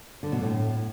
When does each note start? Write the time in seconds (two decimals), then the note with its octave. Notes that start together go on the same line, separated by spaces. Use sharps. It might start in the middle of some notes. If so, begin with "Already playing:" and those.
0.23 D3
0.32 B2
0.42 A2